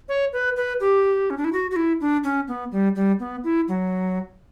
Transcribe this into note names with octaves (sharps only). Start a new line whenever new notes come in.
C#5
B4
B4
G4
C#4
D4
E4
F#4
F#4
E4
D4
C#4
B3
G3
G3
B3
E4
F#3